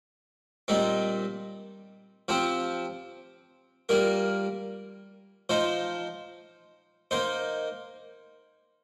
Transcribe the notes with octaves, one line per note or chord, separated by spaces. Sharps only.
A#2 G3 C4 D#4
F3 C4 G4
G3 A#3 F4 A#4
F3 D#4 C5
A#3 D#4 C5